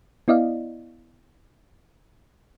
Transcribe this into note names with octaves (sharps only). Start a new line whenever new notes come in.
B3 E4 D5 D#5 F5